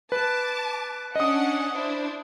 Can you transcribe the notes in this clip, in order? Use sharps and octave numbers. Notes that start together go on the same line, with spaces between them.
B4 A5 D6
C#4 D4 D#5 F#5 D#6
D4 E4 C5